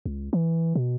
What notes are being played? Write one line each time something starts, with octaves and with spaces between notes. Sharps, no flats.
C#2
E3
B2